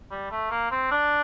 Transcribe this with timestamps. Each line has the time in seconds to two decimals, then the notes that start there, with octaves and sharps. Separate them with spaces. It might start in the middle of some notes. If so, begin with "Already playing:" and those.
0.11 G3
0.31 A3
0.51 A#3
0.71 C4
0.91 D4